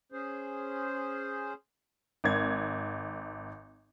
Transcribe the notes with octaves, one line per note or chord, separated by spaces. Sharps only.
C#4 G#4 C5
G#1 G#6